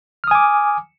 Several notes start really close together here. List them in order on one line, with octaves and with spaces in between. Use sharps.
F6 D#6 G#5 D6